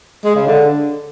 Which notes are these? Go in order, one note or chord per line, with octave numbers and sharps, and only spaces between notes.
G#3
C#3
D3